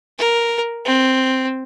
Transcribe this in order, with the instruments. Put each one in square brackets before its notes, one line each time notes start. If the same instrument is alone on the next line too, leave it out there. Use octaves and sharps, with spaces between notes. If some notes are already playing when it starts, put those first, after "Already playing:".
[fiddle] A#4
C4